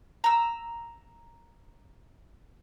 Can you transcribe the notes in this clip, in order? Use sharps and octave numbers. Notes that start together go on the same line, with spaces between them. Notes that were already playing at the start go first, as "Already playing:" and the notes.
A#5 E6